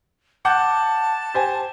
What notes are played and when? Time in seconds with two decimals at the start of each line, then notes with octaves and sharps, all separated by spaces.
0.45 F#5 A5 D6 G6
1.34 G4 C5 G#5